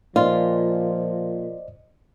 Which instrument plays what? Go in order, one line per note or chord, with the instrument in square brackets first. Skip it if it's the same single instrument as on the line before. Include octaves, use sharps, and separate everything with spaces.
[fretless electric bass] A#2 [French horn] F3 [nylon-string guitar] F4 [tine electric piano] C5 D5 D#5